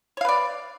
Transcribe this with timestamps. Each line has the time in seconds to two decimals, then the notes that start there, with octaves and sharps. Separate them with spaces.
0.17 C#5
0.21 F5
0.25 B4
0.29 D5